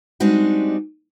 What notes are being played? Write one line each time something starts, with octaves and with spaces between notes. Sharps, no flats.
G3 G#3 C4 D4 D#4 F#4